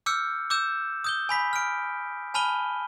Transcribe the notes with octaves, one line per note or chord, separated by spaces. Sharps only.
D6 E6 F6 G6 C#7
D6 E6 G6 E7
D#6 G6 G7
G#5 B5 B6
F6 D7
G#5 A5 B5 F6 D#7 G7